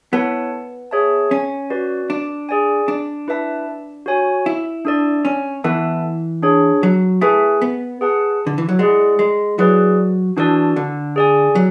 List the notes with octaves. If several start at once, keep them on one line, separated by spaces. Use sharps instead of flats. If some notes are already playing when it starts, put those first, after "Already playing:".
B3 E4 A4 C#5 F#5 A5
G#4 C#5 E5 A5
C#4
F#4 B4 D5
D4
G#4 D5 G#5
D4
E4 B4 E5 A5
F#4 C#5 G#5
E4
D4 A4 D5
C#4
E3 B3 E4 A4 E5 A5
D4 G#4 C#5
F#3
A3 E4 G#4 B4 E5 G#5
B3
G#4 B4 F#5 A5
D3
E3
F#3
G#3 E4 G#4 D5 F#5
G#3
F#3 E4 G#4 B4 D5
E3 D4 F#4 A4 D5 A5
D3
G#4 D5 G#5
F#3